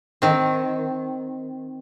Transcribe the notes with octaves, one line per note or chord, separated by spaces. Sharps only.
D#3 C4